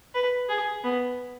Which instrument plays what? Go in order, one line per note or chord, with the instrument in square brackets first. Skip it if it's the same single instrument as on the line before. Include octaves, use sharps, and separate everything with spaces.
[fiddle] B4
G#4
B3